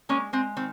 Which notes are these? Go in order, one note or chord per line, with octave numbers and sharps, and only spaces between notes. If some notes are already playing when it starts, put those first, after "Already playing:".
G#3 A#3 C#4
G#3 C4
D#3 C4